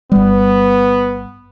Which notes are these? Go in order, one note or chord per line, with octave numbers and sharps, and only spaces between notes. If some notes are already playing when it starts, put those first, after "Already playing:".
G1 G3 B3